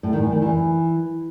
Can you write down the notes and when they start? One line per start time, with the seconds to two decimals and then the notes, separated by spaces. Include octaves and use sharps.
0.03 A2
0.13 D#3
0.23 E3
0.32 D#3
0.42 E3